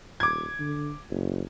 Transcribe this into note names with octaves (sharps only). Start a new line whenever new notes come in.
D#1 D6 G#6
D3
F#1